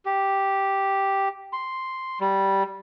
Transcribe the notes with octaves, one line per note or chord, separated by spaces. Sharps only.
G4
C6
G3